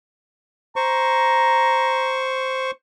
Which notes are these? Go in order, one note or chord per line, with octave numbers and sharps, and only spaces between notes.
C5 A#5 C#6